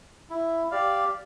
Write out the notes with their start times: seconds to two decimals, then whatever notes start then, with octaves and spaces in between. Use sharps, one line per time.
0.30 E4
0.71 G4 D5 F5